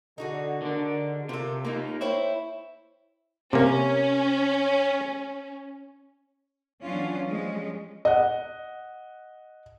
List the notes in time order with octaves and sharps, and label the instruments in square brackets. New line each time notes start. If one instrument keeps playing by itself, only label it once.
[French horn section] D3 [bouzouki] D#4 F#4 G#4
[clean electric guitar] D3 D4 [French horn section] A#4
[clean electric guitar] C3 [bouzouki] F4 A4
[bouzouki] A3 F4 [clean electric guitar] A#3 D#4
[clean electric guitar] E4 [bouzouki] C5 C#5 G5
[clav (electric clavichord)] C3 A#3 [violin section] C#4
[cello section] E3 F#3 B3 C#4 D4 F4
F3 G3 G#3 C#4
[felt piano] D#5 F#5